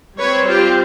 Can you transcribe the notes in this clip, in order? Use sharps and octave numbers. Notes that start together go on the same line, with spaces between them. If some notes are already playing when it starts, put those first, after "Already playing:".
G3 C4 B4 C#5
F4 G4